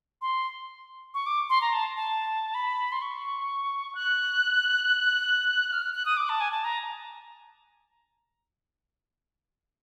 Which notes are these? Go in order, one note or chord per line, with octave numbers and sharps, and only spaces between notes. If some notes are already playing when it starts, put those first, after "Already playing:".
C6
C#6
D6
C6
A#5
A5
A5
B5
C6
C#6
F#6
F6
F#6
F#6
D#6
D6
A5
G#5
A5
A#5